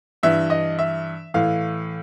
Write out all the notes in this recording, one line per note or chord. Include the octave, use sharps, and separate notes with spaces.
G2 E3 E5
D#5
E5
A2 E3 F5